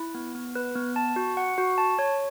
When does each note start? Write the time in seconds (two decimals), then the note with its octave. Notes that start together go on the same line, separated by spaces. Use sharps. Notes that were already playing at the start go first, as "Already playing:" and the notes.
Already playing: E4
0.15 B3
0.35 B3
0.56 B4
0.76 B3
0.96 A5
1.16 F#4
1.37 F#5
1.58 F#4
1.78 A5
1.99 C#5